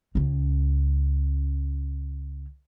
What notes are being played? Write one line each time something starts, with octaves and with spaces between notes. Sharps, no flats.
C#2 C#4